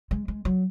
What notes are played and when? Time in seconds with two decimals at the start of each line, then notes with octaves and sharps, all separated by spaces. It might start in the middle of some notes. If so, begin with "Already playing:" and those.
0.11 G#3
0.28 G#3
0.45 F#3